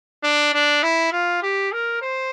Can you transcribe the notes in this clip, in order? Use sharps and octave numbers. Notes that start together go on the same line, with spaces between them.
D4
D4
E4
F4
G4
A#4
C5